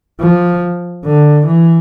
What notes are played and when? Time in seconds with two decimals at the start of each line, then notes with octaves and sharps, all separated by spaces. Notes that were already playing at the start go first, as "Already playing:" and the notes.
0.20 F3
1.05 D3
1.47 E3